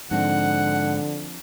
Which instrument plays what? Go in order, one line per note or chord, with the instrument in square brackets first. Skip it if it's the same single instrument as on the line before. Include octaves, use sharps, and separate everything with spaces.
[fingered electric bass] G#2 [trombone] D3 [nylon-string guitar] F3 C4 D4 [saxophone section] F#5